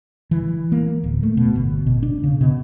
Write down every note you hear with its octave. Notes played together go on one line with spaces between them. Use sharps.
E3
A#3
D1
A3
B2
G1
B2
D4
C#3
B2